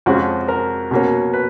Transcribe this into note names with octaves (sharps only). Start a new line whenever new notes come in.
F2 F3 G#3 C#4 F#4
A#4
B2 A#3 C#4
B4